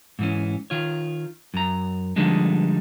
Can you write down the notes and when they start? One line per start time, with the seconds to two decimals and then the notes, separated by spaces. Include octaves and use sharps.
0.19 G#2 E3 C#4
0.70 D#3 F4 C#5
1.54 F#2 A#5
2.16 D3 F3 G3 G#3 D4 D#4